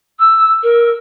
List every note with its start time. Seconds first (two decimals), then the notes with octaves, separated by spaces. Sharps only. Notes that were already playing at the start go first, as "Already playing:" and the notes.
0.19 E6
0.63 A#4